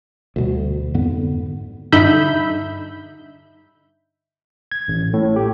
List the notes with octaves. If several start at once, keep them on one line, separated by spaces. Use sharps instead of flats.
D2 B2 G3
F2 G#2 D3 B3
G2 D3 D#4 E5 B5 G6
G#6
A1
A2
G4